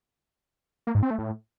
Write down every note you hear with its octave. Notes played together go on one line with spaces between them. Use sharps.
A#3
G#2
C4
A3
A2